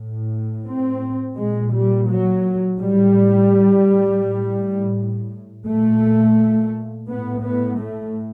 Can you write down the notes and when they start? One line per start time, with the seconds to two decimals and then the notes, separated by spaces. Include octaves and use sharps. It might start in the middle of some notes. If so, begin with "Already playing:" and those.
Already playing: A2
0.64 C4
1.36 A#2 G#3
1.72 G3
2.08 F#3
2.79 A2 G3
4.23 A2
5.66 A#2 A3
7.09 A2 B3
7.44 B3
7.80 A3